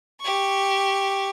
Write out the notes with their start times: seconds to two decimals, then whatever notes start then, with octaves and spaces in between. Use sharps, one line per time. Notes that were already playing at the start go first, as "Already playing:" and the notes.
0.21 G4 C#6